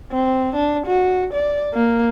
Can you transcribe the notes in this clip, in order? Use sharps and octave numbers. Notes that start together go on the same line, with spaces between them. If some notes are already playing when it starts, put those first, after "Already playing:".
C4
D4
F#4
D5
A#3